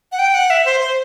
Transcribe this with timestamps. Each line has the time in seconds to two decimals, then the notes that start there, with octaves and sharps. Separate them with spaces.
0.12 F#5
0.19 G5
0.34 F#5
0.50 E5
0.65 C5
0.81 C5